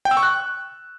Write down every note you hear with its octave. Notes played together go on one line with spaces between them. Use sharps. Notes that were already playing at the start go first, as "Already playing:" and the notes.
G5
E6
C#6
F#6